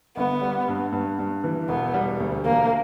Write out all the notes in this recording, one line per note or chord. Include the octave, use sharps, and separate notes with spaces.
G1 B3
G3
G2
G2
G2
E3
E1 B3
G3
D2
E1 A#3